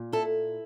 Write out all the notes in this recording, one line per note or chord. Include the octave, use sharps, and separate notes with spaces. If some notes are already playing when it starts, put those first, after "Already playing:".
Already playing: A#2
E4 A4